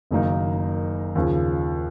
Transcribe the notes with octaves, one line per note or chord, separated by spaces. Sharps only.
F#1 F#2 D#3 A#3 D#4
D#2 C#3 F3